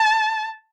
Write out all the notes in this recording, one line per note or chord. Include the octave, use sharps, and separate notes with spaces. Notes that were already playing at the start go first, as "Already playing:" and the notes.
Already playing: A5